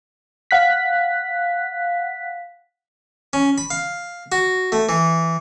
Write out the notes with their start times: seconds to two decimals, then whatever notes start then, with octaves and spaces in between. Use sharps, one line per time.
0.51 F5 F#5 F#6 B6
3.33 C#4
3.58 B5
3.70 F5
4.32 F#4
4.72 A3
4.89 E3